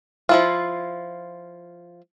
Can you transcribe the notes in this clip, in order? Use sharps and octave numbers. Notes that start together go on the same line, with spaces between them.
F3 E4 F4